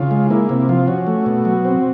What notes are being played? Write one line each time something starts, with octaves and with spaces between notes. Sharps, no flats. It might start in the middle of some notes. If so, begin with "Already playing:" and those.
Already playing: C#3 F4
G#3
A#3 E4
C3 E4
F3 F4
C#4 F#4
A3
B2
F#3
C4